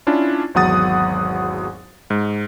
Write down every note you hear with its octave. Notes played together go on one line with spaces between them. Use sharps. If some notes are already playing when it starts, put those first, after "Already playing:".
C#4 D4 E4 F4
G#1 E2 F#3 F#5 D#6 A6
G#2